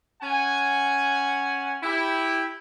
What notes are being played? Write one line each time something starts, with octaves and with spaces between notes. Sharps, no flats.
C#4 F#5 G#5
E4 G4